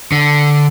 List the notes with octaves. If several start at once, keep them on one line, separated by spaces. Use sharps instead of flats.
D3